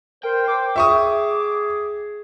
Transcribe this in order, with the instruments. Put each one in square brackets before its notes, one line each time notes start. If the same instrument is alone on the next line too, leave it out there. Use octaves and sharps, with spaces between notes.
[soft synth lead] A#4 [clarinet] C5 [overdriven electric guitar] G5
[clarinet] C5 [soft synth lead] D6
[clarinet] G#4 [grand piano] E5 C#6 D#6